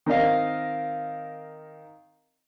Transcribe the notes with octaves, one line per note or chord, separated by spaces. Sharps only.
D#3 C4 A#4 D#5 F5